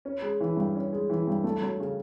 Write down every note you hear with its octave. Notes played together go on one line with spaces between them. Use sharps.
C#4
G#3
E3
G2
C#4
G#3
E3
G2
A3
F#3
C#3